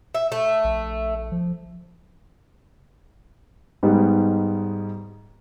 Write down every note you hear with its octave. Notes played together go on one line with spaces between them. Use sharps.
E5
A3
A#1
F3
G#2 G3 B3 D#4